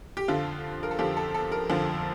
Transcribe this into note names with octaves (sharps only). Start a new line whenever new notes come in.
G4
F2 D3 F3 F4
A#4
A4
F2 D3 F3 G4
A4
A4
A#4
F2 D3 F3